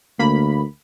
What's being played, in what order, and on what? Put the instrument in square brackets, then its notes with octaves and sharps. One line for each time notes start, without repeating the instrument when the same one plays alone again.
[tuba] D2 [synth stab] A#3 B5